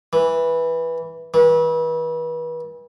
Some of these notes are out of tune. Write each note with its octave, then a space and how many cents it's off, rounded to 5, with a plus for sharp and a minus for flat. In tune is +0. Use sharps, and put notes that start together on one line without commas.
E3 -10
E3 -35